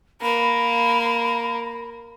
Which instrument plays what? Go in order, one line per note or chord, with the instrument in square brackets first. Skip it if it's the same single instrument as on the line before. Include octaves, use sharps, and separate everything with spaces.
[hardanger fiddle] A#3 [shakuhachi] B5